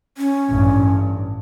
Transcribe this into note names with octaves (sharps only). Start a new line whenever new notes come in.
C#4
A1 G2